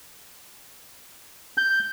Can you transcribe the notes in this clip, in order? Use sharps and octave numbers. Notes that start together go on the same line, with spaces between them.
G6